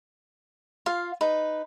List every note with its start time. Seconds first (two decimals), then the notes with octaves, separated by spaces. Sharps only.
0.86 F4 F5
1.21 D#4 B4